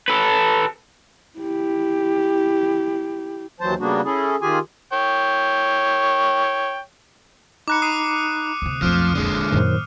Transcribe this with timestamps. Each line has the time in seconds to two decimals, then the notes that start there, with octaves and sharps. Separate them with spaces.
0.08 A4 B4
1.38 E4 G4
3.60 D#2 E3 F#3 C5 A5
3.79 C#3 G3 A#3 B3 D4 F#4
4.04 C#4 E4 G#4 A4
4.41 D#3 F4 G4 G#4 G#5
4.93 C#5 G5
7.68 D#4 A#5 B5 D6 F#6 C#7
7.82 D#6 C7 D#7
8.62 D2 C3
8.82 B1 F2 F3 A3 D4 F6
9.15 D#1 D3 G#3
9.52 F#2 A#2 D#3 F#3 C5